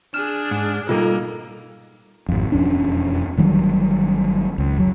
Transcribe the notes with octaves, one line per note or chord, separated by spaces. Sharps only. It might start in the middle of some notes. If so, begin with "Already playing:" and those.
D4 G#4 F6 E7
G#2
B2 G3 A#3 D#4 F4 A4
G#1 F2
E1 F2 C#4 D4
G1 D#3 F#3 G3
C#2
F#1 F#3